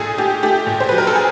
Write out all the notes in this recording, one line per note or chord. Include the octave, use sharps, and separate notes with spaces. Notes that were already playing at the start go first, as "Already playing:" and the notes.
Already playing: A#2 A3 G#4 A4
A3 G4
A3 G4
A#2
C5
F#3 B4
A#4
A4
G#4